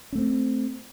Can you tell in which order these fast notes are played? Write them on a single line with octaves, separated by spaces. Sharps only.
C#4 A3 C4